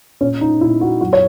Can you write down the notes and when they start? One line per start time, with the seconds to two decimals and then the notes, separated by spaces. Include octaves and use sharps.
0.21 A#2 C#4
0.41 D#4
0.61 A#2 E4
0.81 F#4
1.01 F#2 F#4
1.13 C#5